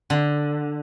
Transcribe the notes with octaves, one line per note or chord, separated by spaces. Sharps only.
D3